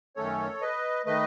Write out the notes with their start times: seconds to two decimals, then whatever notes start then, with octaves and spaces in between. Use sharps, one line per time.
0.16 F#2 D#3 A3 C#4 A4 C#5
0.61 B4 D#5
1.06 D#3 A3 B4 D#5